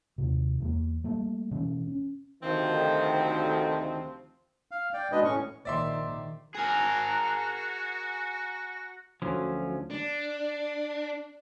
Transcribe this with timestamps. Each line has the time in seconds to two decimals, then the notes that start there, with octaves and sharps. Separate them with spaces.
0.18 D#2 C3
0.60 E2 A3 A#3
1.04 G3 A3 A#3
1.51 B2 E3 C#4
1.87 C#4
2.43 D2 C3 D#3 F3 C4
4.71 F5
4.94 D5 G5
5.12 B2 G#3 D4 B4 D#5
5.25 A2 C#4 C#6
5.65 A#1 D#3 D5 E5 C6
6.55 F#4 G#4 A#4
9.22 D2 F3 F#3 C#4
9.91 D4